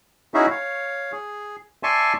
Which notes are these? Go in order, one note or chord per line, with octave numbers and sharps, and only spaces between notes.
C#4 D#4 E4 F#4 G#4 E5
C#5 F5
G#4
D5 E5 G#5 A5 C6 C#6